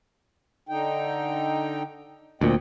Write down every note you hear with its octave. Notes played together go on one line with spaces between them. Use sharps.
D3 D#4 G5
D2 A#2 C4 D#5 G5